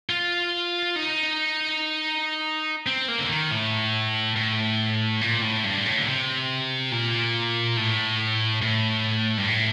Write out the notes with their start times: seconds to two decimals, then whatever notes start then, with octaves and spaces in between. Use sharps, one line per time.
0.10 F4
0.96 D#4
2.87 C4
3.08 A#3
3.19 D3
3.29 D#3
3.51 A2
4.36 A2
5.21 A#2
5.42 A2
5.64 G2
5.86 A2
5.98 D3
6.07 C3
6.92 A#2
7.77 A2
8.62 A2
9.38 G2
9.48 A2